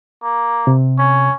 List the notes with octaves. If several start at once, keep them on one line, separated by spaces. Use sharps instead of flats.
A#3
C3
C#4